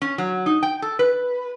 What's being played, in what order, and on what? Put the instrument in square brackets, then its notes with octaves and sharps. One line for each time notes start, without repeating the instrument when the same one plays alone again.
[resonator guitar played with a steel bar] C#4
F#3
D#4
G5
A4
B4